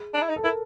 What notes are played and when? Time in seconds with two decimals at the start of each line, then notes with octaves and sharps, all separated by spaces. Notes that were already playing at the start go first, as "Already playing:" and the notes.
Already playing: G#4
0.14 D4
0.22 E4
0.29 D#4
0.36 A4
0.44 E4 A#4